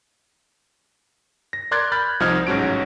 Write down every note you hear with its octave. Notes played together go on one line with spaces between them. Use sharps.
A#6
A#4 D5 C6 F#6 G#6 A6
B5 F6 G6 A6
C2 F3 D#4 D#5 F6 G#6
A1 G#2 F#3 C#4 F#4 D7